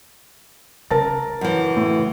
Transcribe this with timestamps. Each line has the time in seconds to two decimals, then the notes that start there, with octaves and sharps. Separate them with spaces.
0.91 C#3 A#4 A5 A6
1.41 F#2 E3
1.77 A2